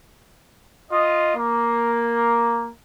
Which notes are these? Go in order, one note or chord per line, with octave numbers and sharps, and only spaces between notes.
F4 D#5
A#3